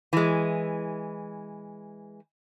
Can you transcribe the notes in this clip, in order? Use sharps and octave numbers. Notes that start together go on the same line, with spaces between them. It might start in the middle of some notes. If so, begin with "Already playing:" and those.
E3 G#3